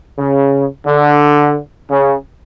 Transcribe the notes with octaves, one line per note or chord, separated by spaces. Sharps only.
C#3
D3
C#3